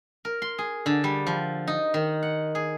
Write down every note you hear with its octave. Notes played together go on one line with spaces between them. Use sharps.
A#4
C6
G#4
D3
G3
F3
D#4
D#3
F#5
G#4